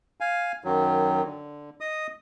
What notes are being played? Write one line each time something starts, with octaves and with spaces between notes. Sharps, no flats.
F5 G#5
F#2 D#3 F#3
D3
D#5 D#6